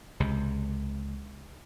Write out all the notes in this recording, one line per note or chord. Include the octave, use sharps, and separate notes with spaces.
C#2 C3